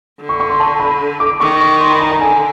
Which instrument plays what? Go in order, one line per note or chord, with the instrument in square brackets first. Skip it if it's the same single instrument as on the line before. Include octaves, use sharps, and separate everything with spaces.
[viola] D3
[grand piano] C#6
C#6
C6
A5
B5
D6
[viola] D#3 [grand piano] C#6
[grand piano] C#6
C6
B5
A#5
A#5
[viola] D3 [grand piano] G#5